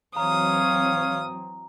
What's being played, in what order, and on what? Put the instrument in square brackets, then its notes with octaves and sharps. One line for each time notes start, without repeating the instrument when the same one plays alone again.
[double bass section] E3 F#3 C4 [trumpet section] C#5 F5 [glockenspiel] A#5 [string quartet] D#6